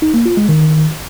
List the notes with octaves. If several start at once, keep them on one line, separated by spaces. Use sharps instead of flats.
D#4
A#3
F4
G#3
D#3